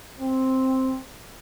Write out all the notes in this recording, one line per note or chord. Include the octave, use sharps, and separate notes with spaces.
C4